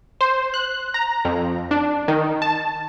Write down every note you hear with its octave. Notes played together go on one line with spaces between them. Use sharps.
C5
F#6
A#5
F2
D4
D#3
A5